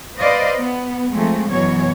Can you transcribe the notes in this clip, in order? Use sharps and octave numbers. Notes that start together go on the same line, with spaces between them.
B4 C5 D5 D#5 F5
B3
F3 G#3 A3 C4
F#2 B2 E3 F#3 C#5